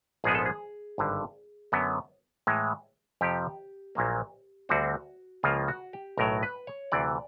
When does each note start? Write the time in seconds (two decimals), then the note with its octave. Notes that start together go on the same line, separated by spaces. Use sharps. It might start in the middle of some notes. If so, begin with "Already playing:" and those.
0.24 A#1 G#2 F3 G#3 B3 G#4
0.35 A4
0.46 G#4
0.98 G#1 G2 D3
1.72 F#2 D3 F#3 B3
2.47 A2 E3 G#3
3.21 F2 C3 F3 G4
3.95 A#1 A#2 F#3 A#3
4.69 D2 D3 G3 C4 F#4
5.43 C#2 C#3 F3 A#3 F4
5.68 F#4
5.93 G4
6.17 B1 A2 F#3 A#4
6.43 B4
6.67 C#5
6.92 D2 C3 E3 D5